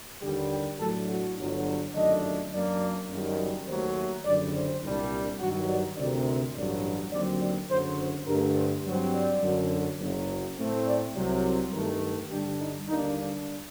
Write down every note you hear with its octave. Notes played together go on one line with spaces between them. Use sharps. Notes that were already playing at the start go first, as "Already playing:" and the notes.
D#2 D3 G3 G4
G4
A2 F#3 A3 D4 A4
F#4
G1 G2 D3 F#3
G1 F#2 D#3 A3 D4 D#5
F#2 F#3 A#3 D4 D5
F#1 F#2 D#3 G3
D#2 D#3 F#3 A3 C5
F#1 F#2 D3 G3 D5
C5
C2 A#2 G3 D4
G2 D#3 F#3 F#4
D5
D2 C3 D#3 D5
C5
A1 G2 F#3 D5
D#2 D3 F#3 C4 D5
D5
F#1 F#2 D3 F#3 C5
C5
G2 D3 A3 A#4
C5
G2 F#3 C4
D5
F#2 D3 F#3
F#1 F#2 F#3
A2 A3 C4
D5
C2 C3 F#3
G2 D#3 A3 A#4
G2 D3 G3 D4 G4
D#4
D#2 D3 G3 A#3 D4 D#4
D4